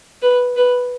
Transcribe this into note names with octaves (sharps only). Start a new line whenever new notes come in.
B4
B4